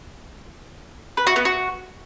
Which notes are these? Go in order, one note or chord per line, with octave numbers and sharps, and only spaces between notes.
B4
F#4
B3
F#4